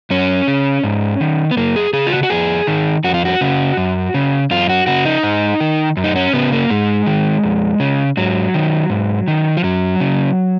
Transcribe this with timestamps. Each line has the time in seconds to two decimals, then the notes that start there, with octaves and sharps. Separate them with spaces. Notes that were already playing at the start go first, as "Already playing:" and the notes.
0.10 F#2 C#4
0.48 C#3
0.84 G#2
1.21 D#3
1.51 B3
1.57 F#2 A#3
1.76 G#4
1.93 C#3 G#4
2.07 F4
2.12 F#4
2.23 F#4
2.30 F2 G#4
2.67 D#3
3.04 F2 F#4
3.14 F4
3.25 F#4
3.41 C#3
3.77 F#2
4.14 C#3
4.51 F#2 F4
4.69 F#4
4.87 C#3 F#4
5.05 D#4
5.23 G#2
5.60 D#3
5.97 F#2
6.04 D#4
6.16 C#4
6.33 C#3 B3
6.52 A#3
6.70 G#2 G#3
7.06 D#3
7.44 F2
7.80 C#3
8.17 G#2 F#3
8.54 D#3
8.90 G#2
9.28 D#3
9.57 F3
9.64 F#2 F#3
10.00 C#3